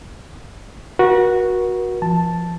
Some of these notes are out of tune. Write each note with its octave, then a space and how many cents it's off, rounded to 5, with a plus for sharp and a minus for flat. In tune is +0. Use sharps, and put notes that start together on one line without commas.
F#4 -5 A#4 +45
F3 -25 A5 +0